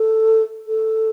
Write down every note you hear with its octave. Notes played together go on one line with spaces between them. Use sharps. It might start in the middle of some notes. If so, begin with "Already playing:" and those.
Already playing: A4
A4